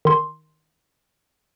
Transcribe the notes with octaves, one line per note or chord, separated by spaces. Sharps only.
D#3 C6